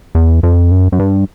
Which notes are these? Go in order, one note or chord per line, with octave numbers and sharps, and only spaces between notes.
E2
F2
F#2
F#2
G2